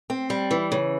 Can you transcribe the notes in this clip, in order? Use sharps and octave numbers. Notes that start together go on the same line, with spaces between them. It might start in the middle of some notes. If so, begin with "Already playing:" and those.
C4
G3
E3
C#3